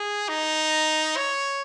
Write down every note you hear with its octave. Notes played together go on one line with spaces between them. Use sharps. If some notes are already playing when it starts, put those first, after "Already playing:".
Already playing: G#4
D#4
C#5